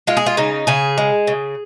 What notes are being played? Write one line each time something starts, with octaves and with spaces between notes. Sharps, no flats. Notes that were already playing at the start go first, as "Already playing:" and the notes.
G#3 F4
G#4
F4
C#3 D#4
C#3 G#4
G#3
C#3